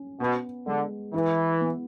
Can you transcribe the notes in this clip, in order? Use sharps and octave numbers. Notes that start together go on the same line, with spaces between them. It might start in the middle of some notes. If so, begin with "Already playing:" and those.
Already playing: C#4
B2 B3
D3 G#3
E3 E4
B3